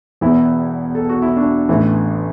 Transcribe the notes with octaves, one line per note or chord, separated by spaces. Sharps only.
E1 E2 E3 E4
A4
F#4
E4
D4 F#4
A1 A2 E3